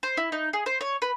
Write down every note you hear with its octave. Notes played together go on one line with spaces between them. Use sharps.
C5
E4
D#4
G#4
C5
C#5
B4